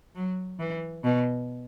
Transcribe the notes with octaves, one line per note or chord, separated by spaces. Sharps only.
F#3
E3
B2